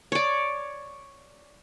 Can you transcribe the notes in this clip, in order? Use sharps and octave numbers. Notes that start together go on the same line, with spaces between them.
C#5 D5